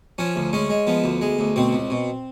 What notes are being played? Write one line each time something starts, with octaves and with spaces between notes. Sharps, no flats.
F3 C#4
D2
G#3 C#4
G#3
F3 B3
D2
G#3
D2
B2 C4
C#2
B2